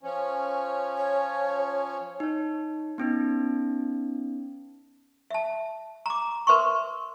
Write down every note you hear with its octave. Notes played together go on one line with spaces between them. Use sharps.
F3 C#4
C#5
D#4 C#5
B3 C#4 D#4
E5 A5
A#5 D6
A#4 B4 E5 C6 C#6